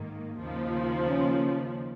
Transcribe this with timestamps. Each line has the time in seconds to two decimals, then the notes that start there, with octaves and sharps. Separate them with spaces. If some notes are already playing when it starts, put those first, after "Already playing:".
Already playing: G#2 D#3 A#3
0.38 D#2 C#3 F3
1.09 C#4